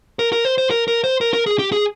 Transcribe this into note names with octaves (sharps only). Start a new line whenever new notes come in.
A#4
A#4
C5
C5
A#4
A#4
C5
A#4
A#4
G#4
G4
G#4